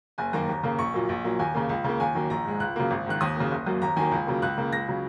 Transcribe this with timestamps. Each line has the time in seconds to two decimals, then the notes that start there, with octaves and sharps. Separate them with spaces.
0.18 F#1 G#5
0.33 F#2 D#3 A#3 A#5
0.49 D#2
0.63 C#3 A#3
0.78 A#1 C#6
0.94 A#2 F#3 A#3
1.09 A#1
1.24 A#2 F#3 A#3
1.39 D#2 G#5
1.54 C#3 A#3
1.69 C#2
1.84 C#3 A#3
2.00 D#2 G#5
2.15 D#3 F#3 A#3
2.30 A#1 A#5
2.45 G#2 G#3
2.60 C#2 F#6
2.76 C#3 F#3 A#3
2.91 G#1
3.06 G#2 D#3 F#6
3.21 D#2 D#6
3.36 C#3 F#3 A#3
3.51 F#1
3.66 F#2 F#3 A#3
3.81 D#2 A#5
3.96 D#3 F#3 A#3 G#5
4.12 C#2
4.27 C#3 F#3 A#3
4.42 C#2 F#6
4.57 C#3 A#3
4.72 C#2 A#6
4.87 C#3 F#3